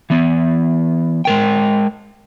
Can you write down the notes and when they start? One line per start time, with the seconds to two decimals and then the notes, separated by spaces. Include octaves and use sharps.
0.10 E3 B3
1.25 G#3 A#4 G5